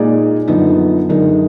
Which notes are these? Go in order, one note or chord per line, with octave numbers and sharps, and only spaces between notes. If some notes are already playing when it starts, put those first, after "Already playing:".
Already playing: A#2 G#3 D#4 G#4 D5
F#2 D3 F3 B3 D#4
F#2 D3 G#3 D#4 A#4